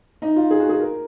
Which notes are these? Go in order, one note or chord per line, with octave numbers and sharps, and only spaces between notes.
D#4
F4
G#4
F#4
G#4
A#4